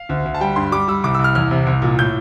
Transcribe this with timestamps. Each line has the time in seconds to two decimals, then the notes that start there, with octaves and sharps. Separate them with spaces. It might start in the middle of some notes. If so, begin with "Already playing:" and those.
Already playing: F5
0.09 D2
0.25 D2
0.34 A5
0.40 G3 G5
0.56 G2 C6
0.72 G3 D6
0.88 G3 E6
1.04 C2 D6
1.14 E6
1.19 C2
1.24 F6
1.35 E2 F6
1.51 C3
1.67 C2
1.82 A#2
1.99 A2 G6